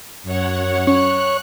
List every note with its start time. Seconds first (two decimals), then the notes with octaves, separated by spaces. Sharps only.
0.23 F#2 C#5 F#5
0.87 C#4 C#5 F#6